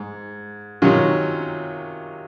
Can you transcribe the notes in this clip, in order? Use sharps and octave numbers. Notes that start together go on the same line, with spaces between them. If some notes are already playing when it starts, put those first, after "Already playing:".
Already playing: G#2
C3 D#3 F#3 C#4 F4